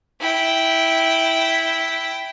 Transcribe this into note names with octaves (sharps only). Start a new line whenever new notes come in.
E4 G5